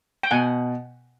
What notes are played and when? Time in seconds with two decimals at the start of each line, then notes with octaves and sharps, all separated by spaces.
0.23 G5
0.31 B2 F#5 G#5